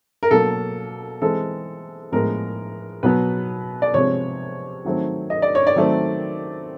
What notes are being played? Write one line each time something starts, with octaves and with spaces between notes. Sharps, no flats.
A#4
B2 F#3 A#3 A4
E3 G#3 C4 A4
A2 F3 G#3 B3 A#4
B2 F#3 B3 B4
D5
C3 F3 G#3 C4 C#5
D#3 F#3 A3 C4
D#5
D5
C#5
D5
D#3 F#3 A3 C4